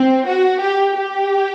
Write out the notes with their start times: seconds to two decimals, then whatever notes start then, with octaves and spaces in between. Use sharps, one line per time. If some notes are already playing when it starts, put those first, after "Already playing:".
Already playing: C4
0.26 F#4
0.61 G4
0.95 G4